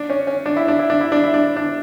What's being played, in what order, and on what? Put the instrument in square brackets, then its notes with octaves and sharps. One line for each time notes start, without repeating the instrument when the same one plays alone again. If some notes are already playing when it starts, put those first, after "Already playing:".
Already playing: [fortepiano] D4
C#4
C#4
D4
E4
D4
E4
D4
E4
D4
E4
D4
D4